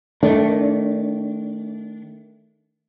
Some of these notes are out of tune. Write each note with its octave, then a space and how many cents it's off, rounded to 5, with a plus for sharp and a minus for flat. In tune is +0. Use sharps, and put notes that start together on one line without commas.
D#3 +0 A3 +0 D4 -30